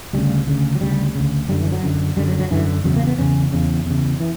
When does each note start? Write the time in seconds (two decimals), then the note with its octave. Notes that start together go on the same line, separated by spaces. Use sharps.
0.13 D2 C#3 G3
0.47 D2 C#3
0.75 F#3
0.81 D2 C#3 G3
1.15 D2 C#3
1.49 F#2 D3 G3
1.61 E3
1.72 F#3
1.83 F#2 D3
2.17 F#2 D3 G3
2.28 F#3
2.39 F#3
2.51 F#2 D3 E3
2.84 E2 C#3 F#3
2.96 A#3
3.07 B3
3.18 E2 C#3 C#4
3.52 E2 C#3
3.86 E2 C#3
4.20 E3